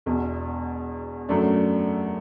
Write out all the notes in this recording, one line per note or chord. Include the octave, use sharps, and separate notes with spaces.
E1 E2 B2
F#2 F#3 A3 D4